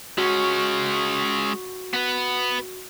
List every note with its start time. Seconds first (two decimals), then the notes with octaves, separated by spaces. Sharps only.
0.18 G#3 C#4 F#4
1.93 B3 B4